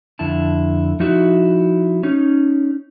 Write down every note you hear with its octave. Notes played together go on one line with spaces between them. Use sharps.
F2 D3 E4 A5
F3 D#4 E4 F#4
C#4 D#4